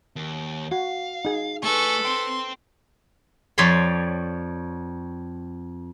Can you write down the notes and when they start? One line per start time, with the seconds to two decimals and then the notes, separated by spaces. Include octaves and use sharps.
0.16 D#2
0.72 F#4 F5
1.25 D#4 G#4
1.63 A3 A4 B4 G#5 C#6
2.05 C5 G5 C6
3.58 F2 C#5 D5 A5 B5 C6